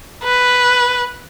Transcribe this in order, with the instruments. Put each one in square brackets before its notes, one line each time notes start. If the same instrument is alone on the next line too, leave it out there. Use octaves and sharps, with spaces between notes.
[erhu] B4